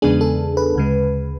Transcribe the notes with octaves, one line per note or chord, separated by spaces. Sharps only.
E2 C#3 G#3 B3 D4 G#4
A4
B4
D2 C#3 G#3